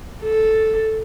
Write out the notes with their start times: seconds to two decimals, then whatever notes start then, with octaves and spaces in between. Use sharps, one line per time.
0.23 A4